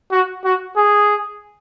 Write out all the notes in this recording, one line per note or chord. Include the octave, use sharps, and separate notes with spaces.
F#4
F#4
G#4